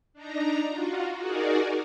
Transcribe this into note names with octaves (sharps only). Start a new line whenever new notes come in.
D4 D#4 A#5
F4 F#4
D#4 F#4 G#4 A#4 D5